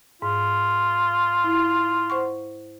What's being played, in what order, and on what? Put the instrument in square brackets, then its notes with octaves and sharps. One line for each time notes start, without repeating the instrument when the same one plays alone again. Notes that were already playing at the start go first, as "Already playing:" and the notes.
[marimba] G#2 [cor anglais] F4
[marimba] E4
C5 F#5 C#6